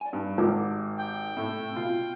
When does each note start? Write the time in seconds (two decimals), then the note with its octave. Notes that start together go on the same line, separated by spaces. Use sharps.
0.01 D5 G#5
0.13 G2 D#4 G4
0.38 G#1 A#4 D6
0.98 G5
1.37 A2 C3
1.76 B2 F4